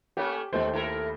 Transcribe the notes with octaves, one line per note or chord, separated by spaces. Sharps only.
A3 A#3 C#4 G4
D#2 G#3 A3 C5
E4 A4 A#4